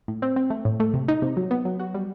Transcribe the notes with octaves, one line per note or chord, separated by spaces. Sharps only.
A2
C4
C4
A3
A2
A3
C3
D#4
C3
F#3
B3
F#3
F#4
G3